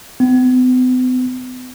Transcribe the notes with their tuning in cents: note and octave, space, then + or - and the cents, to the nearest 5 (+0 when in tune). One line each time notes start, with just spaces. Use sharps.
B3 +45